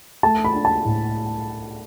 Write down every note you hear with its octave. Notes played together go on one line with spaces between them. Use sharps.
A3 A5
B5
D4
A5
A2